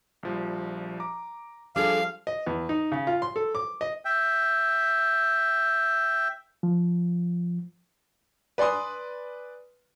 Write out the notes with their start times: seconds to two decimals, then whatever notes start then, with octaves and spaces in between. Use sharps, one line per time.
0.23 A#1 F3 G3
1.00 A#5 D6
1.76 F3 G3 D4 G#4 A4 F5 D6
2.27 D#5
2.47 E2
2.69 D#4
2.92 C#3
3.07 F4
3.22 C6
3.36 A4
3.55 D6
3.81 D#5
4.05 E5 G5
6.63 F3
8.58 B4 D5 G#5 C6 D#6